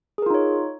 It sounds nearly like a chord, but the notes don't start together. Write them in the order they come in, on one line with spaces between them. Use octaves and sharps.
G#4 A#4 F4 D#4 C#5